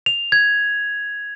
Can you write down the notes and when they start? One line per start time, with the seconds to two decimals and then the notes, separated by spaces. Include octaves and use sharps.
0.06 F7
0.32 G#6